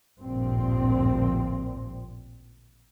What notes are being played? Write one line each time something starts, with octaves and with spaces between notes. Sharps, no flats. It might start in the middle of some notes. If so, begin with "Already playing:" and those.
A1 D2 G2 A#2 F3 C4